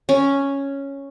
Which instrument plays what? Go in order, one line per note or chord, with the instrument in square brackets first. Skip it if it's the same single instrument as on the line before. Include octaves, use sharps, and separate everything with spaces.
[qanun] C#4